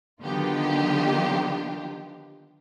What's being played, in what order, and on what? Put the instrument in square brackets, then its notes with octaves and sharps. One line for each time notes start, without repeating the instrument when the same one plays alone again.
[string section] D3 D#3 F#3 B3 F4 G4